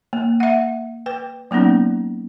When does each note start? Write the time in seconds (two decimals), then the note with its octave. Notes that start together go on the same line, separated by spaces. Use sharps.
0.13 A#3
0.40 E5 F#5
1.06 B4 G5
1.51 F#3 A#3 B3 C#4 D#4